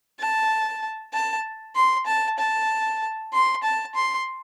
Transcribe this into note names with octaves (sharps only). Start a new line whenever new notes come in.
A5
A5
C6
A5
A5
C6
A5
C6